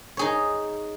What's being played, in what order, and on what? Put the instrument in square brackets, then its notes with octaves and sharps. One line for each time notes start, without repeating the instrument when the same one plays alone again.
[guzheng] D#4 G#4 C#5